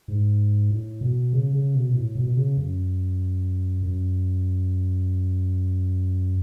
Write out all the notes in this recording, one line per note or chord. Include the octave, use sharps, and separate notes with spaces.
G#2
A2
B2
C#3
C#3
B2
B2
A2
B2
B2
C#3
F#2
F#2